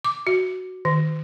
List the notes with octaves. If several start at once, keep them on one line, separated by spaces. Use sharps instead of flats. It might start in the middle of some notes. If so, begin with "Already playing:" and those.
D6
F#4
D#3